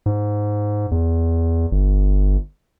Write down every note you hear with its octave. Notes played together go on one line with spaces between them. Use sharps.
G#2
E2
G1